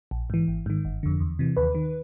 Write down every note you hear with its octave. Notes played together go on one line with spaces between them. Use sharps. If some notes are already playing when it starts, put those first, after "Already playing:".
A#1
G#2 E3
G#1
G#2 D#3
G1
F2 D3
E2
C3 E3
D#2 B4
D#3